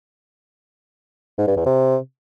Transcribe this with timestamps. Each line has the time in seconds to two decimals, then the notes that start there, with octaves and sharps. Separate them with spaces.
1.38 G#2
1.47 G2
1.57 E2
1.66 C3